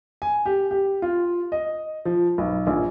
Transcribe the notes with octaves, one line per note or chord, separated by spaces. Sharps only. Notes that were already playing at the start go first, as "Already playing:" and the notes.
G#5
G4
G4
F4
D#5
F3
B1
A#1